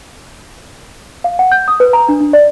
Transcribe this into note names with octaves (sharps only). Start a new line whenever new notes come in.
F5
F#5
G6
D#6
B4
A#5
D4
D4
D5